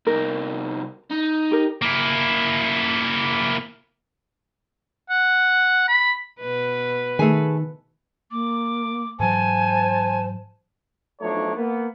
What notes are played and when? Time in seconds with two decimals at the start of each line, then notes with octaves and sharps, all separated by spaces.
0.07 C2 D#4 A#4
1.10 D#4
1.51 G4 A#4
1.82 A#3 E4
5.10 F#5
5.88 B5
6.40 B2 B4
7.19 D#3 A3 G#4 G#5
8.31 A#3 D6
9.20 G#2 E3 F#3 C5 G#5 A5
11.21 B1 F3 A3 D4 D#4 C#5
11.56 A#3 B3